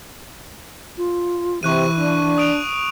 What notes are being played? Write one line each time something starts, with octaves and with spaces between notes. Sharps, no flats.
F4
C3 E3 C#6 F#6 D#7
D4
D#6 D7 F7